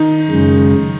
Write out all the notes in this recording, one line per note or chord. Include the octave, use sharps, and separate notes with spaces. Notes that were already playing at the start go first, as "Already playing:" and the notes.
Already playing: D#3 D#4
F#2 C#3 G#3